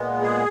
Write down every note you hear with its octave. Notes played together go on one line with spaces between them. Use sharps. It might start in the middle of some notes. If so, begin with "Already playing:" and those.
Already playing: A#2 G#3 B3
G#4